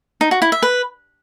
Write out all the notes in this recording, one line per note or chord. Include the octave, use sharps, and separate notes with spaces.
D#4
F#4
E4
E5
B4